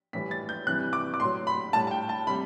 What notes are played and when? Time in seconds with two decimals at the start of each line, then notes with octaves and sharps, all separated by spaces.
0.13 A2 E3 G3 B6
0.31 A6
0.49 G6
0.67 C3 E3 G3 F#6
0.93 D6
1.14 D6
1.20 A2 F#3 C6
1.47 B5
1.73 A2 G3 A5
1.87 A5
1.91 G5
2.09 A5
2.27 C3 G3 B5